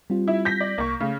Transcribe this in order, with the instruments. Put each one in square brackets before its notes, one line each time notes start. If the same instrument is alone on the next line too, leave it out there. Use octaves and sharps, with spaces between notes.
[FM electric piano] G3 C4 F4
[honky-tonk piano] E4
G6 A#6 B6
D5
[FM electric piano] C2 [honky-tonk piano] A#3 C#6
[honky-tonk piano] C#3 [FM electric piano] A3